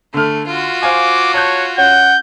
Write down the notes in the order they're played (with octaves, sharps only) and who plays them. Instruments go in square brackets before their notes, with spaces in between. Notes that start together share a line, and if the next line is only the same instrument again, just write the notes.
[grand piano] D3 F6 [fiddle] A3
[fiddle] F4 F#4
[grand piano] C5 F5 G#5 [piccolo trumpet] D6
[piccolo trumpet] C#5 [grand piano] A5 F#6 G6
[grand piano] C#4 [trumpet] F#5 [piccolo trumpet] G6